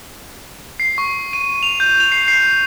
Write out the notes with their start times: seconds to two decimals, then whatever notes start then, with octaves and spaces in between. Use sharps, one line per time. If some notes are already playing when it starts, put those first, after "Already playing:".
0.80 C7
0.98 C#6
1.33 D#7
1.63 F7
1.80 G6
2.00 F7
2.12 C7
2.28 C7